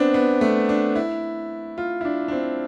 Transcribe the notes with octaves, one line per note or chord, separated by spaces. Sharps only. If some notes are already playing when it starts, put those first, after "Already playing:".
Already playing: B3 C4 D4
B3
A3
D4
E4
F4
E4
D4
D4
C4